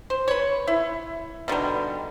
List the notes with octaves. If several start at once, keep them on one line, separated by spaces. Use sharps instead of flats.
C5
B4 C#5
E4
B2 D3 D#3 G3